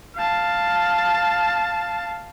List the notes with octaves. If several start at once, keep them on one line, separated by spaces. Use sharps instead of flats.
F5 A5